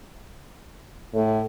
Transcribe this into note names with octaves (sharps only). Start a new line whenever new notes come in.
A2